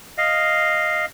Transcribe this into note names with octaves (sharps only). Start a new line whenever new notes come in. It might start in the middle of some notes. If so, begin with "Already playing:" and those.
D#5 F5